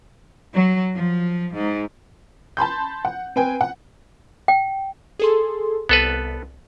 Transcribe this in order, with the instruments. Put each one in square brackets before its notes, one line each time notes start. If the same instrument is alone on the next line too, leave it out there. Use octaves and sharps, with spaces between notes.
[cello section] F#3
F3
G#2
[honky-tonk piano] A5 B5 C6 G6
F#5
C4 B4 G5 G#5
F#5
[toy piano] G5
[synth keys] G#4 A4 C6
[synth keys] C2 [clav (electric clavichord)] B3 A4 B4